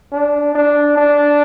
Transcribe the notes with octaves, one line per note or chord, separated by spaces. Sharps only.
D4
D4
D4